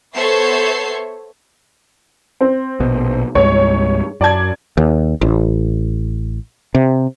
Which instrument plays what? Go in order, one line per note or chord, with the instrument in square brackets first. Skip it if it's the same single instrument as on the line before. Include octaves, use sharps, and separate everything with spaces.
[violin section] B3 A4 C5 C#5 E5 C7
[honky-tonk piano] C4
[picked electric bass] A#1 B2
[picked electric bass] C2 G2 G#3 [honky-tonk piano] C#5
[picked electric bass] F#2 [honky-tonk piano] D5 A5 G#6
[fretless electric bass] D#2
A1
C3